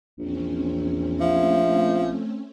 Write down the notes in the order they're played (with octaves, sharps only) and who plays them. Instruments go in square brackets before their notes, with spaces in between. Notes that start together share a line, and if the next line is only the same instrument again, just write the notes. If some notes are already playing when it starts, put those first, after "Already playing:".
[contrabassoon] A#1 [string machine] E2 C4 C#4
[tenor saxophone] F3 [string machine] A3 C4 C#4 [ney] E5